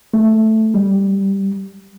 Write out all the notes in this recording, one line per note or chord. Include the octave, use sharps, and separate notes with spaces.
A3
G3